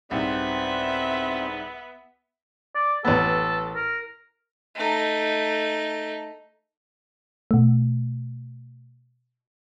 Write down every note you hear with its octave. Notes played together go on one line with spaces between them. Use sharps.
C2 G#2 C3 B3 C4 E5
D5
A1 B3 A4
A#4
A3 D#4
B2 A3